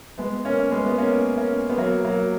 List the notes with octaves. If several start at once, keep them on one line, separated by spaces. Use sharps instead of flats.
G#3 B3
A#3 C#4
G#3 B3
B3
A#3 C#4
A#3 C#4
B3
F#3 A#3
F#3 A#3